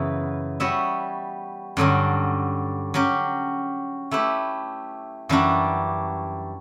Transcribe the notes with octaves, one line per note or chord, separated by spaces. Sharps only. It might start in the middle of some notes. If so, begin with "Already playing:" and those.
Already playing: F#2 C#3 E3 B3
G3 B3 F#4 C#5 E5
G2 D3 F#3 C#4
F#3 C#4 G4
A3 E4 G4 B4
F#2 E3 G3 D4 F#4